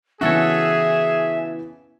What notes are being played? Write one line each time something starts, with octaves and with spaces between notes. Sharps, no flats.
C#3 E3 B3 F#4 G#4 A4 C#5 E5